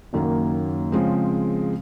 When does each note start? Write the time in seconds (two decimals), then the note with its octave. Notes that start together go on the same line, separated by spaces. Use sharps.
0.13 F#1 F#2 D#3 F#3 A#3
0.92 C#3 F3 G#3 C4